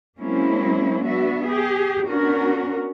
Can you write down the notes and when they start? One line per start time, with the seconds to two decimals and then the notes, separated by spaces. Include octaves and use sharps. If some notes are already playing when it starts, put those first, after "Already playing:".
0.19 F#3 G#3 A#3 C4 C#4 E4
1.04 B3 D4 F#4 E5
1.47 G4 G#4
2.06 B3 C#4 D4 F#4 A#4